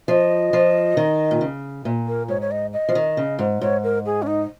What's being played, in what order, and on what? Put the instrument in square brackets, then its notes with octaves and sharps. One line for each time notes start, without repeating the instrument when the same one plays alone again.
[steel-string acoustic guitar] F3 [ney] D#5
[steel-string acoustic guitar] F3
D#3
A#2
C#3
A#2
[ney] A#4
[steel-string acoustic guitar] G#2 [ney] C#5
[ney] C#5
D#5
D#5
[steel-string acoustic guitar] F3
D#3
C#3
G#2
[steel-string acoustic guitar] G#2 [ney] C#5
[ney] A#4
G#4
C#4
D#4